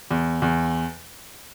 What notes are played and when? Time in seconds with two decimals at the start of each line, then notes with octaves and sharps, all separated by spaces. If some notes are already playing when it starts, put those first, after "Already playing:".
0.11 E2
0.42 E2